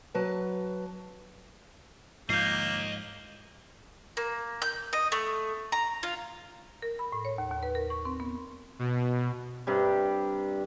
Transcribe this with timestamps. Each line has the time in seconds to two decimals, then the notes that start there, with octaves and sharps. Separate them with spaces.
0.15 F#3 B4 A5
2.29 G#2 F3 A#3 D#5 F5 G6 C7
4.17 A#3
4.62 G6
4.93 D#5
5.12 A3
5.72 A#5
6.03 F4
6.82 A#4
6.99 B5
7.12 A2
7.25 C#5
7.38 D#2
7.51 D#2
7.63 B4
7.75 A#4
7.90 C#6
8.05 C4
8.20 B3
8.79 B2
9.67 G2 C3 G3